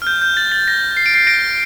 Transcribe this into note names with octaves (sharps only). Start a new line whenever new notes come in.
F6
G6
G6
A6
A6
A#6
C7
D7
C7
A#6 D7